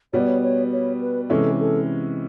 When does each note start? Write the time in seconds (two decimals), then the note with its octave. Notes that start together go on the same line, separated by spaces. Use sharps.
0.13 B2 G3 B3 C#5
0.20 D5
0.28 C#5
0.43 C#5
0.72 C#5
1.00 B4
1.30 C3 E3 G#3 C#4 E4 A4
1.60 A4